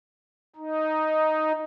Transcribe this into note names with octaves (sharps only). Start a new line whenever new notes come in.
D#4